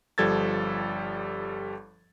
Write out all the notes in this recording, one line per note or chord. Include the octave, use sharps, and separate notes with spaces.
G1 F3 G3 A4 G#6 A6